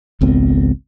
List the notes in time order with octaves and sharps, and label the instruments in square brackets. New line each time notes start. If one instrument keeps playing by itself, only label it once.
[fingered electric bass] G#1 C#2 B3 C4